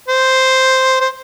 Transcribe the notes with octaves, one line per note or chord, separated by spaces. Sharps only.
C5
C5